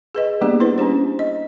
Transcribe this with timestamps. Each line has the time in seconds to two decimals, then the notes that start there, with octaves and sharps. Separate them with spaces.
0.15 G#4 B4 D#5
0.41 G3 A#3 B3 D4 G4 G#4
0.60 E4 B4 C5
0.78 C#4 D4 G4 C5
1.19 D#5